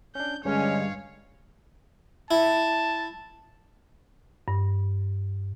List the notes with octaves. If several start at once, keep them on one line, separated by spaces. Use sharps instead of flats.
C#4 D4 G6
G2 D3 G3 G#3 C#4 C#5 F5
E4 A5
G2